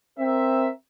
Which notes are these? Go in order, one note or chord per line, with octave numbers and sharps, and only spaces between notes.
C4 A#4 E5